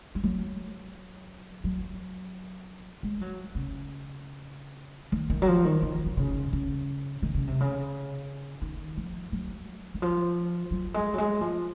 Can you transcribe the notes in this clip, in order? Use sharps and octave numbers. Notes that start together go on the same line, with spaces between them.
G#3
F#3
F#3
G#3
F#3
C#3
D#3
D#3
F#3
F3
D#3
D#3
D#3
C#3
C#3
D#3
C#3
C3
C#3
D#3
F3
F#3
D#3
F3
F#3
G#3
F#3
G#3
F3